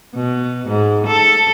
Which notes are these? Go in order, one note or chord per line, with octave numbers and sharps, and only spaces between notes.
B2
G#2
A4